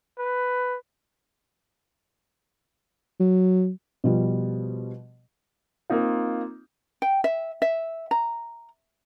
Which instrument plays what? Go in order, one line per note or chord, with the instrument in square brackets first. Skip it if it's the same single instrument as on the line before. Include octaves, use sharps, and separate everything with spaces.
[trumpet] B4
[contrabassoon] F#3
[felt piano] B2 F3 G3
[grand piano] A#3 C4 D#4 F4
[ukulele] G5
E5
E5
A#5